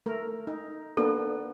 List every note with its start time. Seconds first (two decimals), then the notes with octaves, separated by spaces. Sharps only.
0.06 A3 A#4
0.47 D#4
0.97 A#3 B3 D4 A4